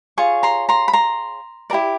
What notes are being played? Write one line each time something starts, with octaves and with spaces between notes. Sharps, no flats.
F4 G#4 C#5 C#6
A#5 C6
A#5 C6
B5
A#5 C6
E4 G4 A#4 D5